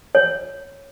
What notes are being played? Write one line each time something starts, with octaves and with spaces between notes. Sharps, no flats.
C#5